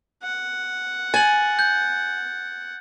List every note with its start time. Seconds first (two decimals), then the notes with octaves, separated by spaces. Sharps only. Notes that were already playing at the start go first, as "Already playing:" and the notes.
0.23 F#5
1.14 G#5 A6 F#7
1.59 G6